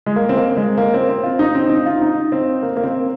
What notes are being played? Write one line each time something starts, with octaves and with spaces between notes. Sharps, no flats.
G#3
A#3
C4
A#3
G#3
A#3
C4
C4
F4
D#4
C4
D#4
F4
D#4
C4
A#3
A#3
C4